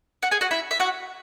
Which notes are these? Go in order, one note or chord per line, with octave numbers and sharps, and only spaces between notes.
F#4 F#5
G#4 G#5
F#4 F#5
E4 E5
E5
F#4 F#5